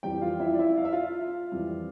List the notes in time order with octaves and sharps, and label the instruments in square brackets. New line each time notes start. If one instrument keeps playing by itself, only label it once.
[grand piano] F2 E3 G3 G4 G5
F4 F5
E4 E5
D5
E4 E5
F5
E5
F4 F5
F2 E3 G3